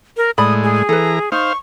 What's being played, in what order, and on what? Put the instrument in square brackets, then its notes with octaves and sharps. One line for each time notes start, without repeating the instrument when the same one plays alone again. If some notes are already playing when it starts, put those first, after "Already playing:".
[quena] A#4
[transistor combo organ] A2 G#3 [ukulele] D5 B5 [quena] D#6
[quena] G#4
[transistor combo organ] E3 A#5 [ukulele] A4 B4
[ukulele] D#4 [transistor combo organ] C5 F5 [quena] C#6